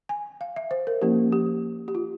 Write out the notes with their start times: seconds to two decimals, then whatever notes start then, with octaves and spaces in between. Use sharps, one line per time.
0.09 G#5
0.41 F5
0.56 E5
0.71 C5
0.87 A#4
1.02 F3 A#3 C#4 E4 G4
1.32 G4
1.88 G4
1.95 F4